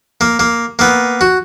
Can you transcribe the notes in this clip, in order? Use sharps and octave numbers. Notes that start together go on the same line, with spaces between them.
A#3
A#3
A#3 B3
F#4